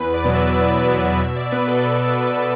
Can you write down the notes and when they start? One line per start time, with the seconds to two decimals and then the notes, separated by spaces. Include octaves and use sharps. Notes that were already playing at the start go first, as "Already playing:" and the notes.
Already playing: E2 B4
0.14 D5
0.24 B2 F#3 B3
0.35 E5
0.56 E2 D5
0.88 B2 F#3 B3 D5
1.20 B2 E5
1.37 D5
1.52 B3 B4
1.68 A4
1.84 B2 B4
2.05 D5
2.15 B3
2.27 B4